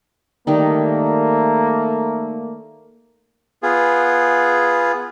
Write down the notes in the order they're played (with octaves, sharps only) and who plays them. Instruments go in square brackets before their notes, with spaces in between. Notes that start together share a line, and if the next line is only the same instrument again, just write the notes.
[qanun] D#3 G3 D#4 [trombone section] A3 A#3
[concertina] B3 F4 G#4